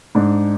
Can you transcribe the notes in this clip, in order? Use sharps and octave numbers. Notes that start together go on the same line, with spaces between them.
G#2 D4